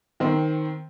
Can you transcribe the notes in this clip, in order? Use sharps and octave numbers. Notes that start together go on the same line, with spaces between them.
D#3 C4